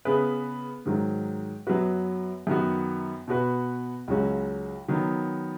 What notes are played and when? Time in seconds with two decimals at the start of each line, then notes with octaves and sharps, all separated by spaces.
0.05 C#3 B3 G#4 B4
0.86 G#2 D#3 F#3
1.67 F#2 F#3 B3 F#4 B4
2.47 F#2 D#3 B3 F#4
3.28 B2 B3 F#4 B4
4.08 C#2 C#3 F#3 C#4 F#4
4.88 D#3 F#3 B3